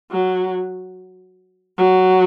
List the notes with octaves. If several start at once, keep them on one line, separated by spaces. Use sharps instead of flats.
F#3
F#3